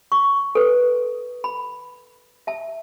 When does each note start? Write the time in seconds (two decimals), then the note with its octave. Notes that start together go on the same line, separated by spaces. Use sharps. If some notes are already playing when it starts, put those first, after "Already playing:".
0.12 C#6
0.55 A4 B4
1.44 B5
2.47 E5 A5